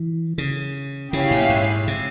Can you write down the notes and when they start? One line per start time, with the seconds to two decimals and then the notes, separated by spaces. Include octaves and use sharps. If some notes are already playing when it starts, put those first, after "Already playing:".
Already playing: E3
0.38 C#3
1.12 C#3 E4 G4 C#5 F5 G#5
1.31 A#2
1.50 G#2
1.88 C3